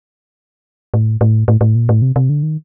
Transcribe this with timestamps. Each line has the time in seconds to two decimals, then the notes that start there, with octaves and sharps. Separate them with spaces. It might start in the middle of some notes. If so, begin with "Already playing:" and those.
0.94 A2
1.21 A2
1.48 A2
1.61 A2
1.75 A#2
1.89 A2
2.02 C3
2.16 C3
2.29 D3
2.43 D#3